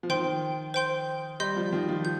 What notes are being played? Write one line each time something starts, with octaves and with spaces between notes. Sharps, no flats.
F3
D#3 C5 G5 C6
C5 G5 C6 G6
G3 D#5 C6 G6
F3
D#3
F3
G6